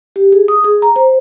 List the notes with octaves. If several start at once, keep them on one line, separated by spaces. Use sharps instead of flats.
G4
G#4
D#6
G#4
A#5
C5